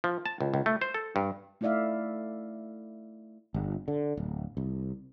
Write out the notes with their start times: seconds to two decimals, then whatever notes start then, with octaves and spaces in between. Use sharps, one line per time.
0.04 F3
0.26 A5
0.41 C#2
0.54 C#2
0.66 A3
0.81 C5
0.94 A4
1.16 G2
1.61 A3 D#4 E4 D5 E5 F5
3.54 G1
3.88 D3
4.17 D1
4.57 C2